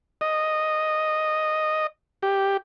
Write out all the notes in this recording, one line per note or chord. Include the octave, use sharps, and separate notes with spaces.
D#5
G4